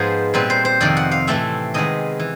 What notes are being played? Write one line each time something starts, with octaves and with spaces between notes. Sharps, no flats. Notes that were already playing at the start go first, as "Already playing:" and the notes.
Already playing: G#2 F3 G#3 B3 C5
A#2 G3 C4 B4
C5
C5
F2 C3 D#3 D5
F#5
F5
A2 E3 A3 C4 E5
C3 D#3 G#3 B3 D#5
E3